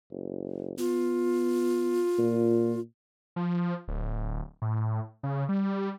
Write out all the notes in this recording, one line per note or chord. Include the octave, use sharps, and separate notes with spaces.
F#1
B3 F4
A#2
F3
D1
A2
C#3
G3